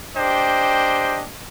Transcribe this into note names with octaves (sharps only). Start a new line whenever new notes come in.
D4 G4 C5 D#5 G5